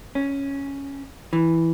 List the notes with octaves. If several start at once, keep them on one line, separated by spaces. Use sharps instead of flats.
C#4
E3